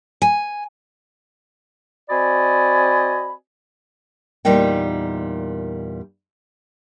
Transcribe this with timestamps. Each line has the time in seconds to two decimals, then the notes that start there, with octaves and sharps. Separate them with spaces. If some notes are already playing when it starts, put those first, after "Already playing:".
0.22 G#5
2.10 C4 F#4 D5 D#5 G#5 B5
4.45 E2 A#2 G3 A#3 D#4 G5